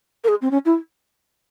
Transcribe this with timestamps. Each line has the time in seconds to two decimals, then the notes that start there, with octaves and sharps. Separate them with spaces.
0.24 A#4
0.28 G#4
0.42 C4
0.51 C#4
0.65 E4